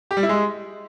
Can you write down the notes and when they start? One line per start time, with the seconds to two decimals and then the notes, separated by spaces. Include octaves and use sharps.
0.11 G4
0.17 G3
0.23 E4
0.29 G#3